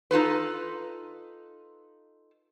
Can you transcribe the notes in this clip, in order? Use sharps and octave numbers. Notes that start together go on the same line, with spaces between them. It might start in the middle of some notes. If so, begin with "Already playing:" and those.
D#4 F4 A4 B4